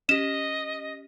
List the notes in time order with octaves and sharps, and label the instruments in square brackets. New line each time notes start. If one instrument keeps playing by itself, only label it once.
[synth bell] C#4 G4 [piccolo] D#5 [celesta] E7